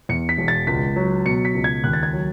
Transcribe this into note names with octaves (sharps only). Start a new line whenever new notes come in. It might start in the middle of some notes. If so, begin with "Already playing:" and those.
E2 C#7
B6
E1
A6
C#2 B6
F#3
B2 C#7
B6
C#2
G#6
D#2 F#6
A6
G#6
F#3